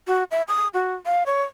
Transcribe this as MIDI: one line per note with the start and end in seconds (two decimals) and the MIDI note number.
0.08 0.24 66
0.31 0.42 76
0.48 0.68 87
0.74 0.94 66
1.06 1.23 77
1.26 1.43 73